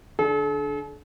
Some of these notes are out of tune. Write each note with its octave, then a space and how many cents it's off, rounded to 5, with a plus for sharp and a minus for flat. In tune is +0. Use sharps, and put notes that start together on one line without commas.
D3 +0 D4 +0 A4 -45